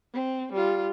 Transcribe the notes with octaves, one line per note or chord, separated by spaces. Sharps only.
C4
G3 F4